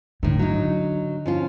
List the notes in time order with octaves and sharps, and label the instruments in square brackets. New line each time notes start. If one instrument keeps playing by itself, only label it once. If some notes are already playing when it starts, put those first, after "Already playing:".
[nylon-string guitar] A2 D#3 [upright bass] D3
[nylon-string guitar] F#3 D#4
F3 C#4 F4